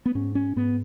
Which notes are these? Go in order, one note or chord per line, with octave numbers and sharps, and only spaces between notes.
B3
G#2 C#4
C#4
G#2 B3